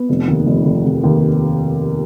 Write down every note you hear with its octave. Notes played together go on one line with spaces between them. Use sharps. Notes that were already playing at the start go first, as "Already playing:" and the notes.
Already playing: B3
F1
D#2
F1
F1
F1
D#2